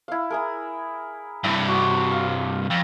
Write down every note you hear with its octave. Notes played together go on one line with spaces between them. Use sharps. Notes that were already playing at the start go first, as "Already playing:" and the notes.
E4 F5
E4 G#4 A#4
G2 C3 E4
F#4
F5
F2